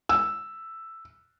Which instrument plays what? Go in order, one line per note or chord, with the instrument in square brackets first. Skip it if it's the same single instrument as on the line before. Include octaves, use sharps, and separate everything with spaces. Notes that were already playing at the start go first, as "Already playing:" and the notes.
[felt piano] E6